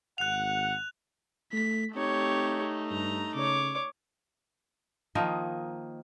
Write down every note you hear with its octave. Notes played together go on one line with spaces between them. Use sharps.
G#1 F#5 F#6 F7
A3 B6
A3 C4 D#4 G4 C#5
G2 A#5
C#3 C#5 D6
D#3 F3 A#3 D#4